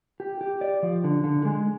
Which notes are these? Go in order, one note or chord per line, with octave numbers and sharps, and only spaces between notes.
G4
G4
D5
F3
D3
D3
G#3